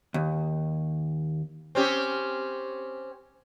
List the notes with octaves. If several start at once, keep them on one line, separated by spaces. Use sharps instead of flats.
D#2
C4 C#4 G4